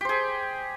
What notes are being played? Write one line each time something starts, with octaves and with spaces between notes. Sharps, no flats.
G4 G#4 C5